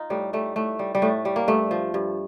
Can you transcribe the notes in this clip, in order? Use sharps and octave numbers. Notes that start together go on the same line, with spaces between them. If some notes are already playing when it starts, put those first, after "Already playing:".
Already playing: D#4 F4
A2 G3
G3 A3
A2 A3
G3
G3
A2 A3
G3
A#3
G2 A3
F3
G2